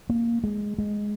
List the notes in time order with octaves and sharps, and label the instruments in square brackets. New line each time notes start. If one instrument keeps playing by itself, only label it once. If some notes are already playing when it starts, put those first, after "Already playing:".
[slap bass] A#3
G#3
G#3